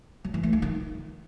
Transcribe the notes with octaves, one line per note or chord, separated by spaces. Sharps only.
F#3
E3
A3
F4
D#3